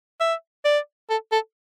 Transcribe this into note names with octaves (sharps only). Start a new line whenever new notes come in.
E5
D5
A4
A4